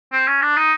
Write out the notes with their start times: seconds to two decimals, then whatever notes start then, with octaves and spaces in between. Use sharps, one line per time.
0.12 C4
0.27 C#4
0.42 D4
0.57 D#4